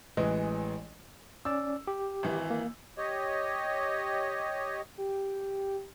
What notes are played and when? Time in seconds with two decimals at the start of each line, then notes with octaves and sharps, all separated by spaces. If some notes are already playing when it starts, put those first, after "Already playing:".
0.17 A1 E3 G#3 D#5
1.45 C#4 D5 E6
1.87 G4
2.23 G#1 E3
2.50 A#3
2.97 G4 C#5 D#5
4.98 G4